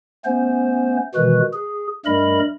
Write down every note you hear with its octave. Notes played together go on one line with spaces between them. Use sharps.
A3 B3 C#4 C5
B2 D#3 E3 G#3 F#4 B4
G#4
G2 G3 A3 A#4 D#5 B5